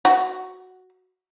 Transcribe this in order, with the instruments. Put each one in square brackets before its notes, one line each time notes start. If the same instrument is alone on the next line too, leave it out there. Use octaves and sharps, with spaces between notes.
[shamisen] F#4